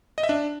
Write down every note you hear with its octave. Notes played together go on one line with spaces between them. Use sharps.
D#5
E5
D4